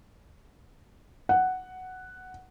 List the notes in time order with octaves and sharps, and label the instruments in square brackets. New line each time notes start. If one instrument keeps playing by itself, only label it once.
[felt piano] F#5